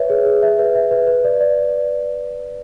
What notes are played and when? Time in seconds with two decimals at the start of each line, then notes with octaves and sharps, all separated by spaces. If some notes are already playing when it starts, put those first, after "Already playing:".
Already playing: B4 C#5 E5
0.10 G#4
0.25 G#4
0.42 E5
0.59 B4
0.75 E5
0.91 B4
1.07 B4
1.24 D5
1.41 D5